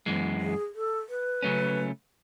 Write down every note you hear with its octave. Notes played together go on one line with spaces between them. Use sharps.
F#2 E3 G#3 B3
G#4
A4
B4
C#3 F#3 A3 C#4